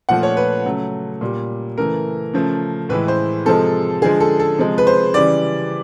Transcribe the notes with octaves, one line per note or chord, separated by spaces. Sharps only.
A#2 F3 A3 F#5
C#5
B4
C#3 F#3 A3
A#2 G3
C#3 E3 A3 A#4
C#3 F3 A3
A2 E3 G#3 B4
C5
C3 F3 G#3 A4
D3 F3 G#3 G#4
A4
A4
C3 F3 G#3
B4
C5
C#3 E3 G3 D5